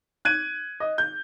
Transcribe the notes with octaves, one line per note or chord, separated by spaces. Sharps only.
F#6 G#6 D#7
D#5
G6